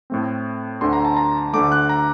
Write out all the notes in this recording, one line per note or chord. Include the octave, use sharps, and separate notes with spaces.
A2 A3 C4
D2 D3 A3 C6
A#5
A5
A#5
D2 D3 A3 D6
F#6
A#5